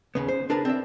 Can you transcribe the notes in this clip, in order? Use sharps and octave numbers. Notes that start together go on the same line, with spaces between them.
D#2 C#3 B3
C5
D4 G#4 A#4 B4 A5
C4 D5 E5